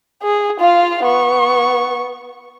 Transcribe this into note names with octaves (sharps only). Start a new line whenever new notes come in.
G#4
F4 F5
B3 C#6